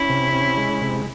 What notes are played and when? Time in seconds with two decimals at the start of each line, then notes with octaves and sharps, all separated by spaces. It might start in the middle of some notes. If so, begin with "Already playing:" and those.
Already playing: C#4 E4
0.09 C3
0.33 C#4
0.58 G#3
0.81 C3